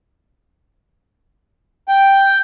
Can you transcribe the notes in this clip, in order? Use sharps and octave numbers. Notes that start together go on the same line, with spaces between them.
G5